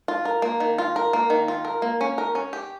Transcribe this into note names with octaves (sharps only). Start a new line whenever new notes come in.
F4
A#4
A#3
D#3
F4
A#4
A#3
D#3
F4
A#4
A#3
C#4
A#4
C#4
G4